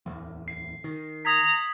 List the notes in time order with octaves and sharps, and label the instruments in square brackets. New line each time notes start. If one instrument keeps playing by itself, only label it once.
[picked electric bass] D1 E2
[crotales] C7
[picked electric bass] D#3
[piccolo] A#5 [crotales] D#6 G#6 B6